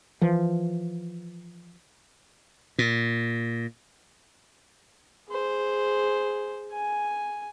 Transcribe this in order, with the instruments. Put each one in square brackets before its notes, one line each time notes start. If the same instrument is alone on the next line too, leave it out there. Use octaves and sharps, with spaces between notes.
[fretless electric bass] E3 F3
[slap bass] A#2
[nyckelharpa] G#4 C5
G#5